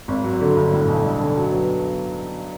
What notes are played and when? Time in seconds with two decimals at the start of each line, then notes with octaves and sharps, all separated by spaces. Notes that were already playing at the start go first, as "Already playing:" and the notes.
0.08 G#1
0.24 F#3
0.41 D3
0.56 G1
0.73 A2
0.89 B1
1.05 G2
1.21 D3
1.37 F#3
1.52 B3